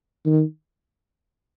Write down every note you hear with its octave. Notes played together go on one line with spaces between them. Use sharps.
D#3